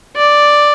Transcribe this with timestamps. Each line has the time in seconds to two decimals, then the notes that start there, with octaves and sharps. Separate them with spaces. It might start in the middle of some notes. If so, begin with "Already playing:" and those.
0.16 D5